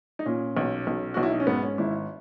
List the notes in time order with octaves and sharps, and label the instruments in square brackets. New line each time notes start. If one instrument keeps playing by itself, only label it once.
[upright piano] D#4
A#2 C#4
B1
B1
B1 F#4
E4
D#4
C#4
G#2 B3
C#4
G#1 E4